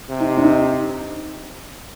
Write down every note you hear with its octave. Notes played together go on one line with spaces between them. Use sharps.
C3
D#4
D4
D#4